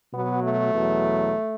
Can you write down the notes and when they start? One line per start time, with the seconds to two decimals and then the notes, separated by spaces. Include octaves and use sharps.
0.11 B2 F#3 B3
0.42 A3
0.73 E2 B2 F#3